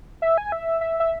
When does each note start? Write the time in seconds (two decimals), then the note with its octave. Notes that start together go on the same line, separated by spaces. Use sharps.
0.22 E5
0.38 G#5
0.52 E5
0.81 E5
1.00 E5